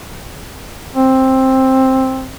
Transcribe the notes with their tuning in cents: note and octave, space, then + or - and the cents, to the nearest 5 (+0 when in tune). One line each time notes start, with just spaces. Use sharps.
C4 +10